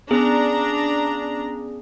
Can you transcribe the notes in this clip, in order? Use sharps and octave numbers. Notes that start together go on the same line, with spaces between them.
B3 C#4 D4 G#4 A#5